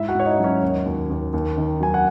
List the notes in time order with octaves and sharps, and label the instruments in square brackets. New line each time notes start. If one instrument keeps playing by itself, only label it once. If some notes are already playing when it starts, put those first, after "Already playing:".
Already playing: [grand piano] G#2 E4 E5
F#4 F#5
G#2 C#5
D#4 D#5
F#3
C#4 C#5
D#2
D#2
D#2
D#2
D#3
F#3 G#5
F#5